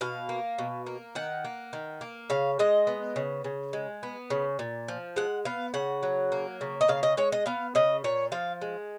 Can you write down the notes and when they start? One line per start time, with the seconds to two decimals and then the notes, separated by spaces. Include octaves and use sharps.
0.01 B2 F5
0.29 A#3
0.58 B2
0.86 A#3
1.15 D#3 F#5
1.45 A#3
1.73 D#3
2.01 A#3
2.30 C#3 F5
2.59 G#3 D#5
2.87 B3
3.16 C#3
3.44 C#3
3.73 G#3
4.03 B3
4.30 C#3
4.59 A#2
4.88 F3
5.16 G#3 F#5
5.45 B3 F5
5.74 C#3 F#5
6.03 F#3
6.32 A#3
6.61 C#3
6.81 D#5
6.88 C#3 F5
7.03 D#5
7.17 G#3 C#5
7.32 D#5
7.46 B3 F5
7.75 C#3 D#5
8.04 A#2 C#5
8.32 F3 F5
8.62 G#3